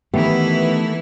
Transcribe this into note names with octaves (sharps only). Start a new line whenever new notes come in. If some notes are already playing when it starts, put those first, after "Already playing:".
D#3 E3 A3 B3 E4 G4